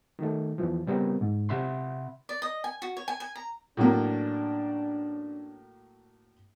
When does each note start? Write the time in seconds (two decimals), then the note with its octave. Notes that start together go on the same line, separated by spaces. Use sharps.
0.19 D#3 A3
0.58 E2 E3 F3
0.87 C#3 G3 B3 C4 A#4
1.21 G#2
1.49 C3 E5 F#5 B5 C6
2.29 D5
2.42 D#5
2.64 G#5
2.82 F#4
2.97 C#5
3.08 G#5
3.20 G#5
3.36 A#5
3.77 A2 F#3 A#3 C#4 D4